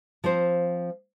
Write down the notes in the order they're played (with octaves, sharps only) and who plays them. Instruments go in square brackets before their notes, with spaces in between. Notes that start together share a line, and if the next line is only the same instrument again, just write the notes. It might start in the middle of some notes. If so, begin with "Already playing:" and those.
[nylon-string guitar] F3 C4 F4 C5